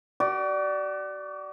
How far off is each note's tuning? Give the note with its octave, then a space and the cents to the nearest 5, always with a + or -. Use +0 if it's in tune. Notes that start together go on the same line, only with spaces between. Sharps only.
F#4 +40 D5 +0